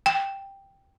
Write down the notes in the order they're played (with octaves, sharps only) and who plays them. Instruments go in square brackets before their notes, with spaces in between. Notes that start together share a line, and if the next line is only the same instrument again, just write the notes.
[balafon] G5